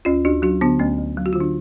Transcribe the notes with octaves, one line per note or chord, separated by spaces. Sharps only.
D2 C#4 F4
D2 D4 F#4
F#3 D4 F#4
D3 B3 D4
D2 A3 C#4
D2
F#3
F#4
F4
D3
D4